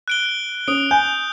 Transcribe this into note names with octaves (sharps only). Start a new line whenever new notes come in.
F#6 D7 G7
C#4 D#6 D7
G#5 G6